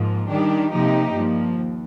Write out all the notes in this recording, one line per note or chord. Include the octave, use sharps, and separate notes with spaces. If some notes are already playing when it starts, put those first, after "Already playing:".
Already playing: G#2 F3 A#3
D#3 G3 D4 G4
C3 F3 A#3 D#4 G4
G2 F3 A#3
D#2